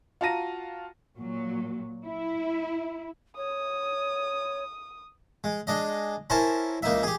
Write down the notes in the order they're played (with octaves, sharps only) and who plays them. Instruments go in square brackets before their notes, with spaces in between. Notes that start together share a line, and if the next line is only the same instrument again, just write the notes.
[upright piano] F4 F#4 A5 A#5 A#6 D#7
[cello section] A#2 F#3
E4
[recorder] C#5 [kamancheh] D#6
[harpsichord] G#3
G#3 D4 D#5
C#4 E4 A#4 C5 A5
C#2 A#3 D#4 E5
G4 G#4